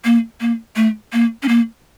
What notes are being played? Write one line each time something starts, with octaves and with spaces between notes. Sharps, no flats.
A#3
A#3
A3
A#3
C#4
A#3